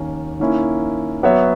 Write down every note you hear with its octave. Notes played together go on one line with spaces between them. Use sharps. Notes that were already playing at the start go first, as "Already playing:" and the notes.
Already playing: D#2 D#3 A#3 C#4
D#3 A#3 C#4 E4
F#3 B3 F#4 C#5 E5